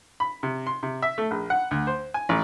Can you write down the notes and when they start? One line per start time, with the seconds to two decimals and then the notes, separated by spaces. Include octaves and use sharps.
0.20 B5
0.43 C3
0.67 C6
0.83 C3
1.02 E5
1.18 A3
1.31 A#1
1.50 F#5
1.71 D2
1.87 C5
2.14 G#5
2.29 A1